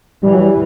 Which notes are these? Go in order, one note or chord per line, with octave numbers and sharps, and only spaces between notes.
E3 G3
F#3
G3